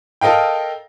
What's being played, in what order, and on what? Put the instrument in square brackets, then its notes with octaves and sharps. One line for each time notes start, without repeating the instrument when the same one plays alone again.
[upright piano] A4 A#4 D#5 F5 G5